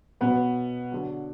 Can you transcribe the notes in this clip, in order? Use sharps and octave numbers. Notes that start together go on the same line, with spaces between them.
B2 F#3 B3 B4
D3 F#3